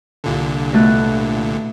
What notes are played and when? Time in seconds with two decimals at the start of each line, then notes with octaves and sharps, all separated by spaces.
0.24 C2 A#2 D3
0.73 B2 A3 F#6